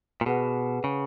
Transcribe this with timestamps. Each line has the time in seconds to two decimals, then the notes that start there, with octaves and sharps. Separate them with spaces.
0.21 A#2
0.26 B2 G#4 B4 F#5
0.84 C#3